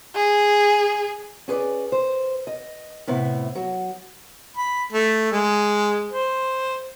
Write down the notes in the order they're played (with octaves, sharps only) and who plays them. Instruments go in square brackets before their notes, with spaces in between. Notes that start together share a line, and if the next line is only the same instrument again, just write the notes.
[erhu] G#4
[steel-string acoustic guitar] C#4 G#4 B4 D5
C5
D#5
A2 C3 B3 E4
F#3
[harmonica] B5
A3
G#3
C5